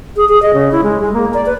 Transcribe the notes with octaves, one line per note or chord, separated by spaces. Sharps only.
G#4
G#4
D#5
C#3
E4
G#3
G#3
A#3
D5
B4